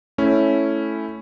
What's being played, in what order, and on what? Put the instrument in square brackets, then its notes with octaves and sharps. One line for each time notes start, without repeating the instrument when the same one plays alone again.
[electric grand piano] A3 C#4 E4